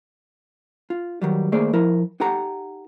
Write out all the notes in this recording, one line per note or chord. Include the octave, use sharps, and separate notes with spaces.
F4
D#3 F#3 G3
D#3 A3 A#3 G#4 C5 D5
F3 E4 A#4
D#4 G4 A4 F#5 A#5